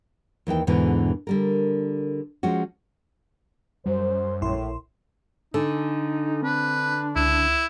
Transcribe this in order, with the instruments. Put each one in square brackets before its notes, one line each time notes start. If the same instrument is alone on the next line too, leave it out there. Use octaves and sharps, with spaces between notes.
[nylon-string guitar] D#2 E3 D#4 G5
E2 G#2 B2 D3 E3
D3 G3 A#4
F3 G#3 C#4 F#4
[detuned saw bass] F#2 [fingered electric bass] G3 [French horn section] C5
[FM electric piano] A#1 E4 C6 [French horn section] A2
[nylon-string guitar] D3 [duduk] D#4 [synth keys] A4 G#5
[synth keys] C4 [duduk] D4 [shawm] B4
[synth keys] C#2 [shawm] E4